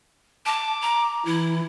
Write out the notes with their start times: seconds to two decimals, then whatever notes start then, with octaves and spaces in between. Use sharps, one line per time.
0.46 A5 D6
0.82 A#5
1.26 E3 E4